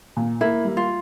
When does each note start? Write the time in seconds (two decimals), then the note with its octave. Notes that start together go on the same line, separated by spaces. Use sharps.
0.17 A#2
0.41 A#3 E4
0.65 G3
0.77 F4